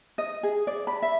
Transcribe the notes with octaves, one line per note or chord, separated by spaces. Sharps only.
D#5
G#4
D5
B5
E5